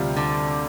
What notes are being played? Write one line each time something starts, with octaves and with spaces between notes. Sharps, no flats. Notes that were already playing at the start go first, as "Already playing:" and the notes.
Already playing: D2 C3 G3 C4 F4
D3